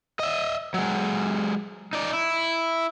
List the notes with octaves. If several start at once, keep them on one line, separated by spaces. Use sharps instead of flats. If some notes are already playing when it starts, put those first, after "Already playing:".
D#5 E5
F#3 G#3
D#4 D5
E4